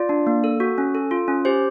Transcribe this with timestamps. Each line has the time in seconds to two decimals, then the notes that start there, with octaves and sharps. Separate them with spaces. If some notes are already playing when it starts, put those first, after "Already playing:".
Already playing: F4 D5
0.09 D4
0.27 A#3
0.44 A4
0.60 F#4
0.78 C#4
0.95 A4
1.11 F4
1.28 C#4
1.45 G4 C5